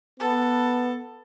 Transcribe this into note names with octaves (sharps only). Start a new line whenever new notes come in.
B3 A4